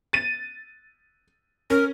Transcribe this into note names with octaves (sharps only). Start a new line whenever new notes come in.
A6 D#7
C#4 A#4